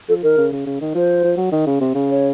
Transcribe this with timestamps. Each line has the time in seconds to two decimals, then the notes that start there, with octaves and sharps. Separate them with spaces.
0.09 F3 A4
0.23 D#3 A#4
0.37 C#3
0.52 C#3
0.66 C#3
0.81 D#3
0.95 F3 C5
1.24 F3
1.37 F#3
1.52 D#3
1.67 C#3
1.81 C3
1.95 C#3
2.10 C#5